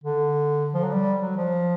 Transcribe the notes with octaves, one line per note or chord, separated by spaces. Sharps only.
D3
F3
F#3
G3
F#3
F3